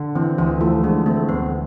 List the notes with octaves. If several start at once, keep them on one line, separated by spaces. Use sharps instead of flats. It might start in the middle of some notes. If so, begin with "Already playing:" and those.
Already playing: D3
E3 C4
D2 E3
F3 A3
D3 G#3
A3 C4
D2 B3